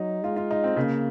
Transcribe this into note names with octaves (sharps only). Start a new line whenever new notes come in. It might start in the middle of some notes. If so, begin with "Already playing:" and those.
Already playing: F#3 D#4
G#3 F4
F4
D#4
C4
C#3 A#3